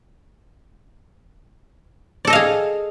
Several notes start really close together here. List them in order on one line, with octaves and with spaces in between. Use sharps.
D5 A4 D#5 F5 G#4